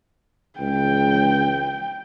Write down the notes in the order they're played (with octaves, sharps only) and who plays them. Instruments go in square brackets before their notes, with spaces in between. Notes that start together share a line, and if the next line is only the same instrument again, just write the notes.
[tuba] C#2 [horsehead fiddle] G5